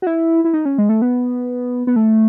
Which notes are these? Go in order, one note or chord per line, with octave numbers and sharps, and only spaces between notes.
F#4
E4
E4
D#4
C#4
G#3
A3
B3
B3
A3